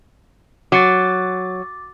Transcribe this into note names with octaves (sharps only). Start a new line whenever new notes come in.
F#3 D6 A6